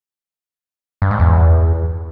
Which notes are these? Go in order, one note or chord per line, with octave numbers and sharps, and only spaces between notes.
G2
G#2
E2